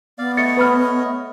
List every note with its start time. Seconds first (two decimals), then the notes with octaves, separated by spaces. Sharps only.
0.18 B3 D5 F5
0.37 A3 C#5 D#5 A6 C#7
0.57 B4 B5 F6